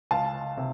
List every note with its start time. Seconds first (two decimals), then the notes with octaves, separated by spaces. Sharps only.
0.11 C#2 F5 A5
0.57 C3